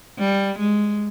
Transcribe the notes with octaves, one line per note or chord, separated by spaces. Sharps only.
G3
G#3